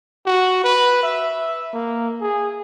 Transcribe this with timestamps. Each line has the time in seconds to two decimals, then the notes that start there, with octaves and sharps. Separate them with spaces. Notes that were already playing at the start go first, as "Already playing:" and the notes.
0.26 F#4
0.64 B4
1.03 E5
1.73 A#3
2.21 G#4